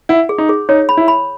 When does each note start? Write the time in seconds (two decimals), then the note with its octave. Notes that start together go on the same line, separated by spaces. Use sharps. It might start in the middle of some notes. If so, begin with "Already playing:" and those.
0.09 E4 F#5
0.29 G#4
0.38 D#4
0.49 G#4
0.69 D#4 C#5
0.89 B5
0.97 E4
1.08 B5